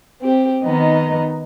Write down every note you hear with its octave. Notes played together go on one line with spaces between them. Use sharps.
C4 G4
D#3 B3 D#4 D#5